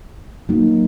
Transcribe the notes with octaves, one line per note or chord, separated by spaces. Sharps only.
F#3 A#3 D#4